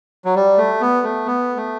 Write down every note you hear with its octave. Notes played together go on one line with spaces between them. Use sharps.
F#3
G3
A3
B3
A3
B3
A3